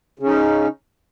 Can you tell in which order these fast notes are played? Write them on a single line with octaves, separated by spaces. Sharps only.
C#3 C#4 D#4